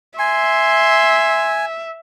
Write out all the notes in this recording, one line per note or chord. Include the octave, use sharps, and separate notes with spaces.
E5 G#5 C6